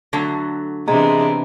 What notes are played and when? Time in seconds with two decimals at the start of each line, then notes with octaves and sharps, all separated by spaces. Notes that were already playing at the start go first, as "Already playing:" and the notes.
0.13 D3 F#3 A3
0.88 C3 E3 G#3 B3 D4 A#5